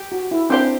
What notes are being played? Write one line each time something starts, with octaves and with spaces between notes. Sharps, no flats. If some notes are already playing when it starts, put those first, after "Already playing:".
Already playing: G4
F#4
E4
C4 D4 G4 C5